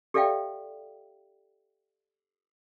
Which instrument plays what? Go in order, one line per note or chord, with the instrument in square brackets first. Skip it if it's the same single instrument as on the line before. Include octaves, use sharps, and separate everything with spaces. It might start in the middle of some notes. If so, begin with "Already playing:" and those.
[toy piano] G4 A4 D5 E5 F5 G5